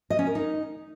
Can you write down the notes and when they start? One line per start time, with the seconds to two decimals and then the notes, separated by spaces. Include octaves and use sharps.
0.10 D#5
0.19 C#4
0.27 A#4
0.35 D#4